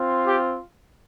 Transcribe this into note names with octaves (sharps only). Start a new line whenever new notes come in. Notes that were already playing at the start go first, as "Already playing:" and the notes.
Already playing: C4 F4
G4